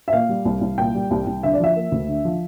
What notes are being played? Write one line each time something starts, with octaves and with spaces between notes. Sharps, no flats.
E5
A#2 F5
G3
C2
C2
A#2 G5
G3
C2
C2
D3 E5
D5
F3 E5
A#3
D2
D3
F3